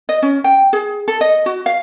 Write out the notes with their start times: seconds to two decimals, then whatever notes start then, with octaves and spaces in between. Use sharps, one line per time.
0.09 D#5
0.22 C#4
0.44 G5
0.73 G#4
1.08 A4
1.21 D#5
1.46 F#4
1.66 F5